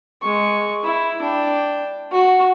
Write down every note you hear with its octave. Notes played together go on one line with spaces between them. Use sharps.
G#3 C#6
E4
D4 G5
F#4